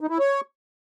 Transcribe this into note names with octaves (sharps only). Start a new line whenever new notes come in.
D#4
E4
C#5